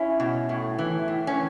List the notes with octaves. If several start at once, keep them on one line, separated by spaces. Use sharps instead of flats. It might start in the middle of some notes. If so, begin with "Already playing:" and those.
Already playing: C#4 E4
B2
A2
E3
A2
C#4